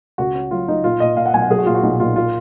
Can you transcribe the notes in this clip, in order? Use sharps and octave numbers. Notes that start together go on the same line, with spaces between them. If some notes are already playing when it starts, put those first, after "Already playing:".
C#2 F#4
C#4
F#3 F4
F#3 D#4
A#2 F4
A#2 D#5
A#2 F5
F#5
B1 G#5
F#5
F#3 G#4
F#4
A#2 F4
F#4
B1 D#4
A#2 F4
F4